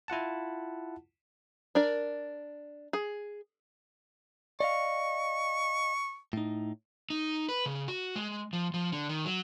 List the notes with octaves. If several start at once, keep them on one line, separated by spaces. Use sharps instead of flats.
E4 F4 F#5 A5
D4 A#4 D5
G#4
D5 D#5 F5 C#6
A2 D#4
D#4
B4
C#3
F#4
G#3
F3
F3
D3
D#3
F#3